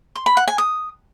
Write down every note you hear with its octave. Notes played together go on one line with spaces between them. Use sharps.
C6
B5
F#5
G#5
D#6